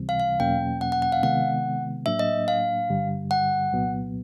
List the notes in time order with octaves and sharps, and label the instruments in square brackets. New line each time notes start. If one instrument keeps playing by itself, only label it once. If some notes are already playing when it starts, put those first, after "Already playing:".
Already playing: [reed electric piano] C#2 C3 E3 G3 C4
[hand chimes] F5
F5
[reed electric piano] E2 B2 F#3 A#3 C#4 [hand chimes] G5
[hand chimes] F#5
F#5
F#5
F5
[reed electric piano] C3 D#3 G#3 B3 [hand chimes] F#5
[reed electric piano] A2 F#3 A#3 D4 [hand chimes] E5
[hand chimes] D#5
F5
[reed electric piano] G2 D3 G3
[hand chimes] F#5
[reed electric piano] C2 A#2 F#3 B3